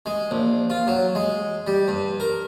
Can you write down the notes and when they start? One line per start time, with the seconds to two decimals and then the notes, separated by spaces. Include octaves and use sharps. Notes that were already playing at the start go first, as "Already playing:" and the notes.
0.06 G#3
0.31 A#1
0.70 F4
0.88 F#3
1.15 G#3
1.67 G3
1.88 G2
2.20 A#4